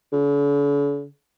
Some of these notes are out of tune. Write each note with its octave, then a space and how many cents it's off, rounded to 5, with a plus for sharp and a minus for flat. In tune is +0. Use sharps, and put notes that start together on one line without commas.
D3 -45